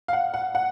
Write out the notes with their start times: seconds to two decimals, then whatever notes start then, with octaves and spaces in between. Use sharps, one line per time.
0.08 F5
0.13 F#5
0.34 F#5
0.55 F#5